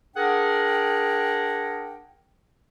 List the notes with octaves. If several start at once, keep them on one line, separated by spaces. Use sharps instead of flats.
D4 G#4 A#4 F#5 G5